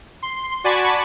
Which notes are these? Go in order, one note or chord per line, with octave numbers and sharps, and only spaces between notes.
C6
F#4 D5 G#5 A5 B5 C#6